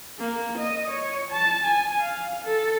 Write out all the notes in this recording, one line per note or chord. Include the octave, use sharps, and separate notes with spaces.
A#3
D#5
C#5
A5
G#5
F5
A4